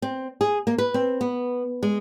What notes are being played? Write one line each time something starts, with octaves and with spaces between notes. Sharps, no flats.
C4
G#4
A#3
B4
C4
B3
G#3